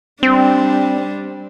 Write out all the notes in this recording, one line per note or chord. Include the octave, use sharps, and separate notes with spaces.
G3 C4 D4